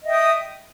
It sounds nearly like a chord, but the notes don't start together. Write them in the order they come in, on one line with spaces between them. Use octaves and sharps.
D#5 E5 G5 D#6